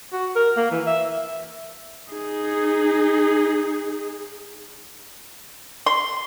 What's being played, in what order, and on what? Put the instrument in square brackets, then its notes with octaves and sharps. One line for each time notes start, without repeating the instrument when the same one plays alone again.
[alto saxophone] F#4
A#4
A#3
E3
E5
[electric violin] D#4 G#4
[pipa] C6